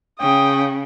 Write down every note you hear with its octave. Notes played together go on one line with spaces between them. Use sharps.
C#3 G5 D#6